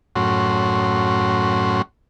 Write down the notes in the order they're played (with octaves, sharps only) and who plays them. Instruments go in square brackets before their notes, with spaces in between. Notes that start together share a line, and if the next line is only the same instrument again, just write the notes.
[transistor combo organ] F#2 A2 C#4 F#4 C6